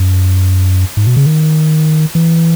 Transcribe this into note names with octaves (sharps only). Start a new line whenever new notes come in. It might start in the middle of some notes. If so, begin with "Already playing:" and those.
Already playing: F#2
G#2
B2
C#3
D#3
E3